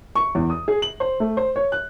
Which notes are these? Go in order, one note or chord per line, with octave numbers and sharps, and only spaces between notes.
C#6
E2
D#6
G#4
F#7
C5
A3
C5
C#5
F#6